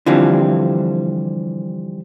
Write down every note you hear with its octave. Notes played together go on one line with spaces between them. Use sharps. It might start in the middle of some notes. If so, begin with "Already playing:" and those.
D3 E3 F3 G3 C4